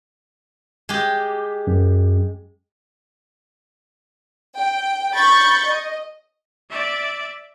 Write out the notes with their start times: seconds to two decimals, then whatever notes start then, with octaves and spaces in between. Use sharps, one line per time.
0.89 G#3 G4
1.67 F#2
4.56 G5
5.15 B5 C#6 G6 A6
5.67 D#5
6.70 D5 E5